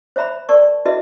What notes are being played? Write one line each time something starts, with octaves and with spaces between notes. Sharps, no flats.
C5 C#5 E5 A#5 B5
A#4 D5 A5 C#6
E4 F#4 A4 B4 D#5 E5